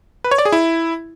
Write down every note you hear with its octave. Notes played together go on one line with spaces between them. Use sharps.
B4
C#5
D5
G#4
E4